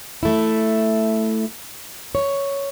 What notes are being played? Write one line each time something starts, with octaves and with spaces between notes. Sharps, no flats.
A3 E4
C#5